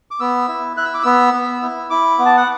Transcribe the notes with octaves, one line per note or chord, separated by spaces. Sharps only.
D6
B3 E6
E4
E4 F#6
E6
D6
B3 E6
B3
E4
E4 D6
B3
A5
F#5